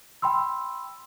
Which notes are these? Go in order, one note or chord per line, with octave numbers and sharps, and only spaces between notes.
G5 B5 C6 E6